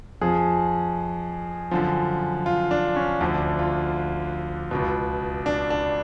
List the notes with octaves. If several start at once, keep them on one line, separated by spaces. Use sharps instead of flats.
F2 F3 G#4
F#2 D3 F3
F4
D4
C#4
D2 D3 F3 D4
F4
C#2 B2
D4
D4